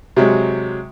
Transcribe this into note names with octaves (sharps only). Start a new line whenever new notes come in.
C3 F#3 G#3